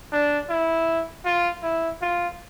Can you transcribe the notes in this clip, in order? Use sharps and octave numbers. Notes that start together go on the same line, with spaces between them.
D4
E4
F4
E4
F4